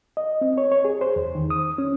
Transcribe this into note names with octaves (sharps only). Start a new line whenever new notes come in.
D#5
C4
C#5
C#5
G#4
C5
E2
D#3
D#6
C#4